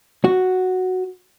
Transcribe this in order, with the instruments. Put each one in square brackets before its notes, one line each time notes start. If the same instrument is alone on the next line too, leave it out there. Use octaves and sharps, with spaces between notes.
[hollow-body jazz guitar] F#4